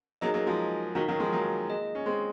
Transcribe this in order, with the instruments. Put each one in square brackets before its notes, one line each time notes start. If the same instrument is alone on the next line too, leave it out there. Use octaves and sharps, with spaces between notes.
[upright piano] F#3 A#3 [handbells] D#4 G#4 D#5
[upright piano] F#3 A#3
F3 G#3
[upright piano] D#3 F#3 [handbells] D#4 F#4 A#4 F5
[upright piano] D#3 F#3
F3 G#3
F#3 A#3
[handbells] A#3 F4 G#4 D#5
[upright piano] C#4
G#3 C4